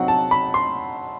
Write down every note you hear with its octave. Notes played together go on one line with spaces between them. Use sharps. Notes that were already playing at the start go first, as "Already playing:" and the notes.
Already playing: F#3 C4 D#4 F#5
A5
B5
C6